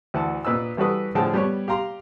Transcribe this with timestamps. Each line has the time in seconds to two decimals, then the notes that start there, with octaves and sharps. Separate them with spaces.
0.14 D2 E3 F#5 A5
0.45 A#2 B4 D#5 E6
0.77 E3 G3 F#4 A4 B4 D#6
1.15 A2 D3 F3 G#4 G5 A5
1.34 G3 B3 G4 C#5
1.68 G4 F5 A#5 C6